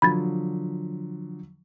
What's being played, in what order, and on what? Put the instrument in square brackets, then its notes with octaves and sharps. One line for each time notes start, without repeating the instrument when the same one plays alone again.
[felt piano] D3 F3 F#3 [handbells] B5 G#6 A6